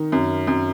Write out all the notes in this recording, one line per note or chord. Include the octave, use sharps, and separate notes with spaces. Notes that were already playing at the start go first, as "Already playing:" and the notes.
Already playing: D#3
F#2
F#2